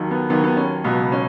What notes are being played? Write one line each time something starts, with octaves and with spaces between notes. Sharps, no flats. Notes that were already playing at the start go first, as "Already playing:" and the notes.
Already playing: D#2 D#3 F#3
B3
D#2 D#3 F#3 B3
B3
C#4
C#2 B2 F#3 B3
C#4